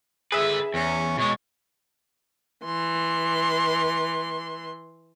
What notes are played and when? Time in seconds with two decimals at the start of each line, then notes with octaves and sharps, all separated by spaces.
0.32 D3 G#4 B4 E5
0.74 E2 C#4
1.18 B2 G#3 C#5
2.65 E3 C6